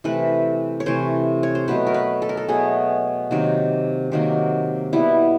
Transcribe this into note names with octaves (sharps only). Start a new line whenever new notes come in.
C3 E3 A3 B4
C#5
C3 E3 A3 C5
C#5
C5
B2 F#3 A3 B4
A#4
B4
A4
A#4
A4
B2 F#3 A3 G#4
C3 D#3 F#3 A#3
C3 D#3 F#3 A#3
B2 G3 B3 E4